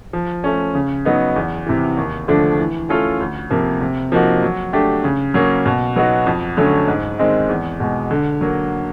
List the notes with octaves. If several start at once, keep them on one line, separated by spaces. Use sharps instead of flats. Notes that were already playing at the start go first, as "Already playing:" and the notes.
F3
A3 C#4
C#3
F#3 B3 D#4
E2
C3 E3
D#2
D3 F3 A3 D4
E3
A3 C#4 F4 A4
D2
C3 F3 A#3
C3
F3 A#3 D#4 F#4
F#3
A3 D4 G4
C#3
F#3 A#3 C#4
B2
F#3 B3 D#4 F#4
F2
D3 F#3 A3 C#4
G#2
D#3 G#3 C4 D#4
E2
B2 G#3
D3
F#3 A#3